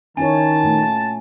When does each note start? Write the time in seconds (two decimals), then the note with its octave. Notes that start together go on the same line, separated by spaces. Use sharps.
0.17 D#3 C#4 E4 C#5 G#5 A5
0.63 A#2 A3